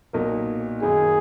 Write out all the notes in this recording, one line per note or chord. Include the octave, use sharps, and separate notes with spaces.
B1 A#2 F#3 A#3 D#4
F#2 D#3 A#3 D#4 G#4